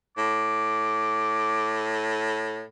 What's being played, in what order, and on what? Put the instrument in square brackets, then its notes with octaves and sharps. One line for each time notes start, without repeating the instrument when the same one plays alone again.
[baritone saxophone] A2 [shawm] D6